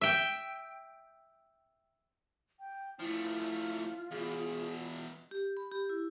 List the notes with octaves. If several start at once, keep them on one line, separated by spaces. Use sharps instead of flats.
E5 G5
G5
F3 A3 E4 F4
E2 B2 G#4
G4
B5
G4
E4